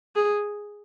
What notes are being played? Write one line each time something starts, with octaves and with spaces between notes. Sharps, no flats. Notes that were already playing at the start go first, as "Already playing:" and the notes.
G#4